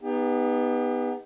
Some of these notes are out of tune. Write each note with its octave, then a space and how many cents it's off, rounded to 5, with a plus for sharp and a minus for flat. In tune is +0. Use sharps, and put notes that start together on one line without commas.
B3 +0 D#4 +0 G4 +40